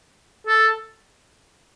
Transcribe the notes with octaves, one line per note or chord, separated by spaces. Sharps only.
A4